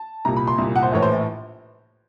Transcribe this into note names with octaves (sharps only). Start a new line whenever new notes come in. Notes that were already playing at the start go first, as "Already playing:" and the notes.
Already playing: A5
C2 A#2 A#5
B5
C6
C2 A#2
F#5
C5
A#1 A2 E3 C#5
C5